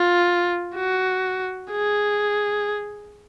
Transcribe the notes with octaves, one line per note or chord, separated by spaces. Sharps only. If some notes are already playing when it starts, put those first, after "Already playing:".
Already playing: F4
F#4
G#4